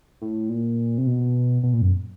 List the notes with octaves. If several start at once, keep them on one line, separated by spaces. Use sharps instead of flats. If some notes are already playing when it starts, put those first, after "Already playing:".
A2
A#2
C3
B2
B2
A#2
F#2